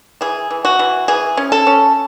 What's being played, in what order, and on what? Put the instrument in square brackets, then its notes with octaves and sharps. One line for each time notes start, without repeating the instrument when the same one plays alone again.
[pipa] E3 G#4
E3
F#4
E3
E3 G#4
C#4
A4
C#4